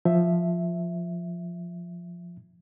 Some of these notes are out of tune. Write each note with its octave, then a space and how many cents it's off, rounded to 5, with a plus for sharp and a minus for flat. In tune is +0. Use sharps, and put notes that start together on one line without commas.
F3 +0 E5 +0